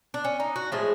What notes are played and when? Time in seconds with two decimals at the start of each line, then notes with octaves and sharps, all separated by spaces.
0.14 D4
0.24 C#4
0.40 D#4
0.56 F#4
0.72 A2 F3 G#3 G#4